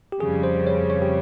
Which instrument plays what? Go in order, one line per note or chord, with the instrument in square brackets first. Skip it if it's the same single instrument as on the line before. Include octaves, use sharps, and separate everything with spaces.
[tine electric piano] G4
[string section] F2 C#3 G3 [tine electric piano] G#4
[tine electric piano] C5
C#5
C#5
G4